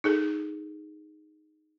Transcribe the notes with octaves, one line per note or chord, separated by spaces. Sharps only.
D#4 G#4 A4